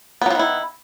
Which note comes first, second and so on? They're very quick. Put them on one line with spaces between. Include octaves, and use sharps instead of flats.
B3 F#3 F3 D#3 E4